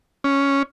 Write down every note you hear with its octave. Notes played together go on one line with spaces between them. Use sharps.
C#4